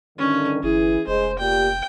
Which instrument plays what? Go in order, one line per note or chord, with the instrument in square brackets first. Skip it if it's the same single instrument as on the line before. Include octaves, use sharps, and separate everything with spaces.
[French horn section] G2 D3 D#3 [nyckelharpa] C#4
[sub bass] G1 [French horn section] E3 E4 [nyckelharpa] G#4
[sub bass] F1 [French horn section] G#3 [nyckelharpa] C5
[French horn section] A#2 G4 [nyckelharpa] G5